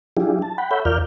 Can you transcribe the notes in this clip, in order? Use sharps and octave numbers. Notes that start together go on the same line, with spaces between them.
F#3 D4 E4 F4 G4 G#4
A5
F#5 G5 B5
A4 C#5 E5 F#5 B5 G6
E2 F4 A#4 D5 F6 G6